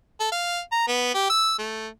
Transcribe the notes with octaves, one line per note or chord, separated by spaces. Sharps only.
A4
F5
A#5
B3
G4
E6
A3